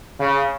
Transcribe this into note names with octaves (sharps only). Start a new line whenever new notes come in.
C#3